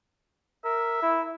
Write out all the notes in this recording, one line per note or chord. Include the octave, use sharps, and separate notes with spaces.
A#4 E5
E4